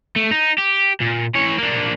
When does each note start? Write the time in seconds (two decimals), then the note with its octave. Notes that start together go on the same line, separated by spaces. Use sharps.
0.16 A3
0.31 D#4
0.58 G4
1.00 A#2
1.35 E3 C#5
1.58 A#3 D4